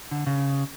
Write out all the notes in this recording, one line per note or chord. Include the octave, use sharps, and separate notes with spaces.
D3
C#3